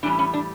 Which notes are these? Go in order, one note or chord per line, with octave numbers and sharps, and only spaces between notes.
A2 E3 G3 C#4 D4
C#4
D4